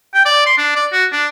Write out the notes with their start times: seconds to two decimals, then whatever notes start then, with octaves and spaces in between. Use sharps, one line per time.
0.14 G5
0.25 D5
0.46 C6
0.57 D4
0.75 D5
0.92 F#4
1.12 D4